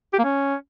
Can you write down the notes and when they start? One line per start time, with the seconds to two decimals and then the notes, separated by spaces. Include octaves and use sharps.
0.13 G4
0.18 A#3
0.24 C#4